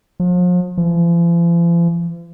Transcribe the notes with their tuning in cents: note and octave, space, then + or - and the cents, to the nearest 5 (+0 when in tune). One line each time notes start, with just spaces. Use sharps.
F3 +40
F3 -45